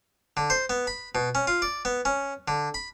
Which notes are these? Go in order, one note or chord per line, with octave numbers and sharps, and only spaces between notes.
D3
C5
B3
B5
B2
C#4
F4
D5
B3
C#4
D3
B5